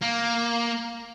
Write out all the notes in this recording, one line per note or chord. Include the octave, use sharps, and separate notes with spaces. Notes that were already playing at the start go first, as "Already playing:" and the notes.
A#3